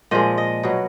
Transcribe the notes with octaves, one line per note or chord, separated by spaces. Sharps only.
A#2 F3 G#3 D#5
D#5
B2 F#3